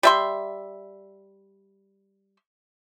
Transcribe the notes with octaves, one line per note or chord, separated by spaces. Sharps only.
G3 E5 C6